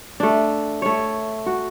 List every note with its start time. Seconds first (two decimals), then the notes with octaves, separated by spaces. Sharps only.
0.20 A3 D4
0.82 A3 C#5
1.46 F#4